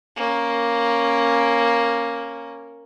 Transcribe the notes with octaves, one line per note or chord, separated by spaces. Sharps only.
A#3 C#4